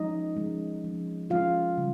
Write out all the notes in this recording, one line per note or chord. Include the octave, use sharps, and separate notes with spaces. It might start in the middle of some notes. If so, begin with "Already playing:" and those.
Already playing: F3 G#3 C#4 D#4 D#5
F3 G#3 C#4
F3 G#3 C#4
F3 G#3 C#4 F4 F5
C#3 G3 C#4